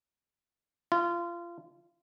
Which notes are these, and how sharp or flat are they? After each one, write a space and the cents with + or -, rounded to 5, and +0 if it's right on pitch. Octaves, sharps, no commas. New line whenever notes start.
F4 -25